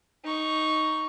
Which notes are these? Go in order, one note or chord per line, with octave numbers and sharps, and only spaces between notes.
D#4 C#6